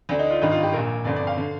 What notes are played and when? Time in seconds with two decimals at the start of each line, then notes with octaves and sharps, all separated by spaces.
0.09 D2 D3 D4
0.19 D#4
0.31 F4
0.42 G#1 G2 D#3 D#4
0.52 F4
0.63 G4
0.73 A#1 A#2 A#4
1.04 G1 F2 D3 D5
1.16 D5
1.27 F5
1.37 D3